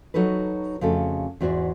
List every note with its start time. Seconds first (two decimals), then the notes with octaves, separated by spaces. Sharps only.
0.14 F#3 D#4 F#4 A4 B4
0.81 F2 C#3 A3 F#4 A4
1.41 E2 G#2 F#4 C5 D5 E5